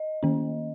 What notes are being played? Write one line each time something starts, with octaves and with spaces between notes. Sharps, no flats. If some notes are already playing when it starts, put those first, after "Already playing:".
Already playing: D#5
D#3 A#3 C#4